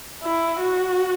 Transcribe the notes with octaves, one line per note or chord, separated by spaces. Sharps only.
E4
F#4